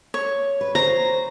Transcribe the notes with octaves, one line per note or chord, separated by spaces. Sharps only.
C#5
B4
C5 A#5